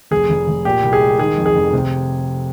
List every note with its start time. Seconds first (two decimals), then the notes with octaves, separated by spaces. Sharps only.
0.11 F1 G#4
0.30 F1
0.48 F1
0.65 A#2 G4
0.83 C2
0.93 G#4
1.01 G#3
1.19 D#3 G#4
1.38 F2
1.46 G#4
1.55 F1
1.73 C3